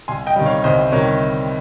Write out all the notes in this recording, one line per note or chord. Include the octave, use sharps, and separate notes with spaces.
C2 G#5 C6
D#5 G5
C3 D#3 G3
C#5 F5
C2 C5 D#5
C3 D#3 G3 A#4 C#5